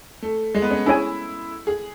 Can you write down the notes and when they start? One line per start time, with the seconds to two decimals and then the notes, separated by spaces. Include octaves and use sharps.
0.22 A3
0.55 G#3
0.62 B3
0.70 C#4
0.86 C#4 E4 G#4 C#5 G#5
1.67 G#4